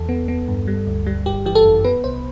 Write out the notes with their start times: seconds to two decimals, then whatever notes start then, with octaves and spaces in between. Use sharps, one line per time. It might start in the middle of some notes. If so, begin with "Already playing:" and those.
Already playing: E2 A4
0.09 B3
0.28 B3
0.48 G2
0.67 G3
0.87 D2
1.06 G3
1.26 G1 G4
1.45 E3 G4
1.55 A4
1.65 F#2
1.84 B3 B4
2.04 C2 C5